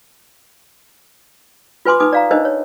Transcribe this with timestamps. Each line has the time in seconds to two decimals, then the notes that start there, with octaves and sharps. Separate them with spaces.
1.85 F4 B4 G#5 C6 D6
2.00 D#4 B4 G#5 D6 D#6
2.13 D5 F5 A#5
2.31 D4 D#4 A#4 C5 D#5
2.45 C#5